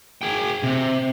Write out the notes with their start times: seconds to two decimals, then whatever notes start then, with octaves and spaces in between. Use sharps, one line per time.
0.22 G#4 G5
0.63 C3